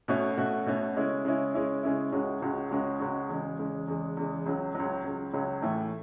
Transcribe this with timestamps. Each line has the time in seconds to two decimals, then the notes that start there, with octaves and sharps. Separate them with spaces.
0.08 B2 A3 C#4 F#4
0.37 B2 A3 C#4 F#4
0.66 B2 A3 C#4 F#4
0.96 C#3 G#3 C#4 E4
1.25 C#3 G#3 C#4 E4
1.54 C#3 G#3 C#4 E4
1.83 C#3 G#3 C#4 E4
2.12 C#2 C#3 G#3 C#4 F#4
2.42 C#2 C#3 G#3 C#4 F#4
2.71 C#2 C#3 G#3 C#4 F#4
3.00 C#2 C#3 G#3 C#4 F#4
3.29 E2 C#3 G#3
3.59 E2 C#3 G#3
3.88 E2 C#3 G#3
4.17 E2 C#3 G#3
4.46 C#2 C#3 F#3
4.75 C#2 C#3 F#3
5.04 C#2 C#3 F#3
5.33 C#2 C#3 F#3
5.62 A2 E3 A3